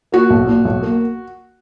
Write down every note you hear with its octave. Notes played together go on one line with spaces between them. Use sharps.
A#3 F#4
B1
A#2
B1
A#3